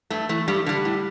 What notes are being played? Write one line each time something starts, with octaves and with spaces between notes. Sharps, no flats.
G2 A3
E3 A3
G2 G3
D3 G3
A2